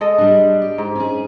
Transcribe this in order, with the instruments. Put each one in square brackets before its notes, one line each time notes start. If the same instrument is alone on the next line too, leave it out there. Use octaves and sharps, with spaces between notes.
[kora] G#3 A4 D#5
[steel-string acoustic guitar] G3 D4
G4
[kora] G#2
[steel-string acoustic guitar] C#4 G#4